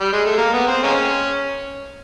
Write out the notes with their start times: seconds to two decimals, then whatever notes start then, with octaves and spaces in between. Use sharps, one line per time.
0.01 G3
0.13 G#3
0.26 A3
0.38 A#3
0.53 B3
0.68 C4
0.83 G#3 A#3 C#4